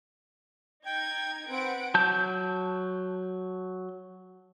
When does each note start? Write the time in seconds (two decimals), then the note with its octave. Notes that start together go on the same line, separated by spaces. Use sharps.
0.86 D#4 G5 G#6
1.50 C4 B4 F#5 D7
1.94 F#3 A5 G6